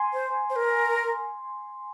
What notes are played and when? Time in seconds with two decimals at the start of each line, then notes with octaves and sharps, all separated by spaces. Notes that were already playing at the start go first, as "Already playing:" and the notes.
Already playing: G#5 C6
0.13 C5
0.50 C5
0.56 A#4